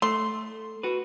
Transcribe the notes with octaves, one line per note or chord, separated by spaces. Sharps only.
A3 C6
F#4 B4